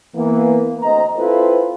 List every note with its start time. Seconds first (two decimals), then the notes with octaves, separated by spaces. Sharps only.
0.15 E3 A#3 B3
0.81 D2 C4 D#5 A#5
1.17 C4 E4 F4 A4 B4 C5